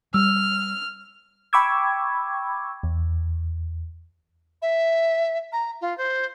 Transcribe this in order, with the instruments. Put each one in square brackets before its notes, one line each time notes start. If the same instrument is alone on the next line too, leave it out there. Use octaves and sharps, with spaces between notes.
[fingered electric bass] G3 [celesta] E6 [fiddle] F6
[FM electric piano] G5 B5 C#6 D6 E6 G#6
E2
[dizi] E5
A#5
F4
C5